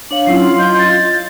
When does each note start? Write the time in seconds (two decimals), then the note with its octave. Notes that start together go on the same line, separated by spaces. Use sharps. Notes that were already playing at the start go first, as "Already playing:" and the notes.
0.11 D4 C#5 F5 F#7
0.27 F#3 C#4 E4 F4 C7
0.59 D#5 G6
0.79 A6